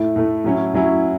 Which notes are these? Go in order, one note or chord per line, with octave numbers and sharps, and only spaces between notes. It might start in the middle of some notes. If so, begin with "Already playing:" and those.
Already playing: A2 A3 E4
A2 A3 E4
A2 F#3 C#4 E4
A2 F#3 C#4 E4